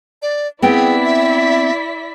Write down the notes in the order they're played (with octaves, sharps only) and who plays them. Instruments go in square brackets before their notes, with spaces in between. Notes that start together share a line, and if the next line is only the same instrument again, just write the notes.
[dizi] D5
[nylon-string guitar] B3 C4 G5 [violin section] E4 D5 B6 [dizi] G#4
[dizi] E5